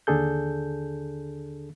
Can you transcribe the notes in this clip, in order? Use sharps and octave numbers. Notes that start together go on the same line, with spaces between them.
D#2 D3 D4 G#4 A4 G6